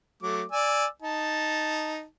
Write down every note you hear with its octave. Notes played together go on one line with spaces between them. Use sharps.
F#3 A3 D6
D5 G#5 E6
D#4 A5